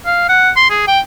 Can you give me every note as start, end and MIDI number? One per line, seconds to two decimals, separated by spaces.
0.06 0.27 77
0.29 0.51 78
0.56 0.68 84
0.70 0.83 68
0.87 1.00 79